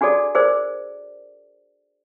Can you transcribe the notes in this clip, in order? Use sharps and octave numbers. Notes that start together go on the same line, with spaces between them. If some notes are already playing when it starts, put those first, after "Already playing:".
D4 F#4 G#4 A4 D5
G#4 A#4 C5 D5